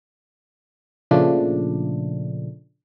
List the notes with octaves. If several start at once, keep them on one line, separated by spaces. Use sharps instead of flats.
A#2 C#3 F3 A3 D4